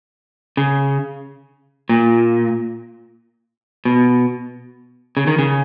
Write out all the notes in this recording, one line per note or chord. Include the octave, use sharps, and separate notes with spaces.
C#3
A#2
B2
C#3
D#3
C#3